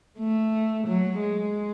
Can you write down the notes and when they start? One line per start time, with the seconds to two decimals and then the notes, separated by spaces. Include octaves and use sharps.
0.19 A3
0.87 F#3
1.21 G#3